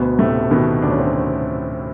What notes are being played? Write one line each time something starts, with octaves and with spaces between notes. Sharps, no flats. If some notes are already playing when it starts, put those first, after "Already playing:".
Already playing: D2 B2 B3
A2 C3 A3
B2 D#3 B3
D2 D4
C#4
C4